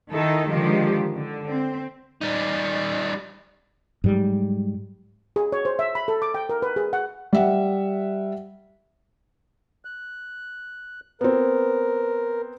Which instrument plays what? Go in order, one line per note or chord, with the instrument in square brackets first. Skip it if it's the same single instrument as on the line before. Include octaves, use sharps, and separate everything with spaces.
[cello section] D#3 D#4 E4 A4
D3 D#3 F3 G#3 G4
D3
C4
[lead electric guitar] G3 D#4
[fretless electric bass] G#2 F#3 G3
[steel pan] G#4
C#5
C5
E5
B5
A4
D6
G5
A#4
B4
G#4
F#5
[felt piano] G3 E5 F#5
[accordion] F#6
[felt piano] B3 C4 [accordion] A#4